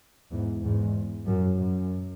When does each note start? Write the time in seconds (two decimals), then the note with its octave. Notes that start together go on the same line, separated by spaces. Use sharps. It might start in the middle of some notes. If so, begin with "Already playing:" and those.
0.32 E2 G#2
0.63 E2 G#2
1.26 F#2
1.58 F#2